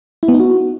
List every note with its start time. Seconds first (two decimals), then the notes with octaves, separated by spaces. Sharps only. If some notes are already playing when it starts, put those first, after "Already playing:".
0.23 E4
0.28 B3
0.34 D#4
0.40 F#4